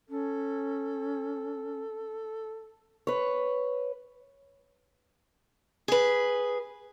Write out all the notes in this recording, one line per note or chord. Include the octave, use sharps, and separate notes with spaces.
C#4 A4
B4 C#5
G#4 B4